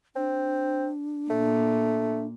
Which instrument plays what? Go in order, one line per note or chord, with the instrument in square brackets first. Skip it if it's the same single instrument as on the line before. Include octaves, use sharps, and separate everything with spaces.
[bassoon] C4 [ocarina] D4
[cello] A#2 [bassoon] A3